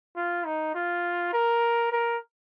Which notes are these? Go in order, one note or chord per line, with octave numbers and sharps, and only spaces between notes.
F4
D#4
F4
A#4
A#4